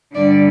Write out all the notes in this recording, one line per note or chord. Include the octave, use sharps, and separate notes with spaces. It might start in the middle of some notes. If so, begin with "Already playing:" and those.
G2 D3 G3 D5